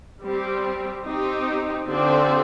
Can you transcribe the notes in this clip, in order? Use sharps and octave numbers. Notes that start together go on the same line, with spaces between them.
G3 C4 G4
C4 D#4 G4
D3 F3 C4 G4 D5